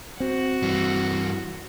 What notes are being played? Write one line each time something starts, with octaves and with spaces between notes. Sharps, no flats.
C4 F#4
G2 E3